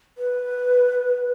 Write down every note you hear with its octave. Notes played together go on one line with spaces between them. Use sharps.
B4